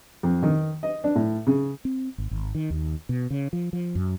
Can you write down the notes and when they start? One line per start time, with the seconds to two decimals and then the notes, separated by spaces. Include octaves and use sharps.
0.23 F2
0.43 D#3
0.83 D#5
1.04 D4
1.15 A2
1.47 C#3
1.85 C4
2.18 G#1
2.31 G#1
2.55 D#3
2.70 D#2
3.09 B2
3.30 C#3
3.53 F3
3.73 F3
3.95 F#2